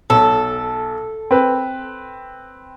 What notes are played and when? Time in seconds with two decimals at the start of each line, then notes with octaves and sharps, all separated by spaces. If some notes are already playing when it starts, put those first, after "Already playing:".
0.10 B1 A4
1.31 C4 B4